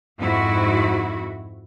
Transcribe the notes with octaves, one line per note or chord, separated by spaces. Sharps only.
F2 G#2 E4 F#4